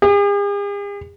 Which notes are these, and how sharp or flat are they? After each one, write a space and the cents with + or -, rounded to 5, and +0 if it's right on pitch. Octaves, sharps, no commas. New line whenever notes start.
G#4 -45